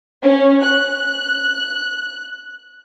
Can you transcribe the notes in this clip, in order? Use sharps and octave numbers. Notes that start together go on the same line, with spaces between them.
C#4
F#6